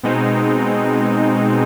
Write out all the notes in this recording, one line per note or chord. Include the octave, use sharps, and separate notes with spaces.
B2 G#3 C4 D#4